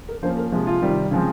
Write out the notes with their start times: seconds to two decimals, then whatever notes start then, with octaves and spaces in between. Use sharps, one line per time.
0.09 A#4
0.23 F3 A#3 C#4 C5
0.37 A#4
0.52 C3 F3 G#3
0.67 F4
0.82 C3 D#3 G3 C4
1.11 C#3 F3 G#3 C4